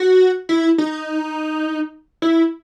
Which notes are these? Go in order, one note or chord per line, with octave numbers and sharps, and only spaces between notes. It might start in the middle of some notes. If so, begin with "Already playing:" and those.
Already playing: F#4
E4
D#4
E4